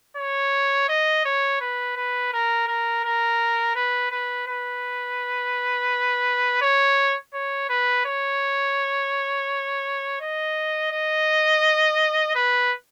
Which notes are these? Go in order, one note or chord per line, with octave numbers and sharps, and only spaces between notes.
C#5
D#5
C#5
B4
B4
A#4
A#4
A#4
B4
B4
B4
C#5
C#5
B4
C#5
D#5
D#5
B4